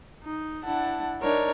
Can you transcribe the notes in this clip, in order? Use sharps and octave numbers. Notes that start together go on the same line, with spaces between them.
D#4
D4 E4 F#5 A5
D4 D#4 A#4 C#5 D5